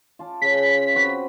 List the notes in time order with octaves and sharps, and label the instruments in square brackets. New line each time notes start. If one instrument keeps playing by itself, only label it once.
[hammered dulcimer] F4 A5 D6
[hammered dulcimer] C#3 [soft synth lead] B6
[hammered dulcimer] C4 F#4 B4